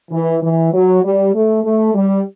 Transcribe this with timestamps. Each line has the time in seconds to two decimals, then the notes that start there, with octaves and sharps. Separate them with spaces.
0.11 E3
0.43 E3
0.73 F#3
1.03 G3
1.33 A3
1.64 A3
1.94 G3